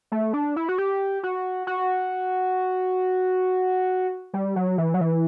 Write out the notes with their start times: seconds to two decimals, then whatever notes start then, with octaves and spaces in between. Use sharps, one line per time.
0.12 A3
0.34 D4
0.56 E4
0.69 F#4
0.78 G4
1.23 F#4
1.67 F#4
4.34 G3
4.56 F#3
4.78 E3
4.94 F#3
5.01 E3